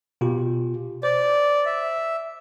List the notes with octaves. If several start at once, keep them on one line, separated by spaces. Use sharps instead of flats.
B2 F4 G4
C5 D5
E5